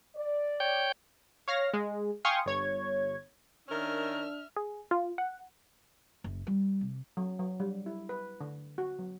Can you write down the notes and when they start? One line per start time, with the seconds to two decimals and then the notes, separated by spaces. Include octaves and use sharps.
0.15 D5
0.60 C#5 G5 G6
1.48 C#5 F5 F6 A#6
1.74 G#3
2.25 F5 G5 G#5 C6 C#6 D#6
2.46 G1 C#5 G#6
3.68 D#3 C#4 D4 A#4 E5 F6
4.56 G#4
4.91 F4
5.18 F#5
6.24 F#1
6.47 G3
6.81 C3
7.17 F#3
7.39 F#3
7.60 G3
7.86 E4
8.09 B4
8.41 D3
8.78 F#4
8.99 F#3